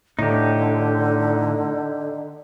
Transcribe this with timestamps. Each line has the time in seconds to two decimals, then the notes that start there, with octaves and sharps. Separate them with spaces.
0.19 A2 D3 D#4 G4